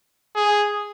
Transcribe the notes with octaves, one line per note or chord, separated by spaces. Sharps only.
G#4